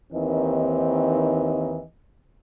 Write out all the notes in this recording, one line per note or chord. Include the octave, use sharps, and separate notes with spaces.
D#2 D#3 E3 C4 D#5